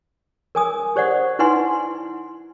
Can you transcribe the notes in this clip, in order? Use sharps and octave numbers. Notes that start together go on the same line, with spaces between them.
A#4 G#5 D#6
G4 C5 D5 F#5
D#4 E4 B4 F#5 G#5 C6